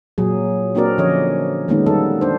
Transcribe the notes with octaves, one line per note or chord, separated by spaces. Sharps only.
A#2 F#3 G#4
A#3 C4 D4 F#4 A#4 D5
D3 F3 C#4 C#5 D#5
D#3 G#3 A#3 B3 C#4 D#4
G3 B3 A4
D4 C5